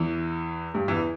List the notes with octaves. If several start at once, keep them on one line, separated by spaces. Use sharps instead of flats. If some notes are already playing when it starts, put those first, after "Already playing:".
Already playing: E2 E3
G2 G3
E2 E3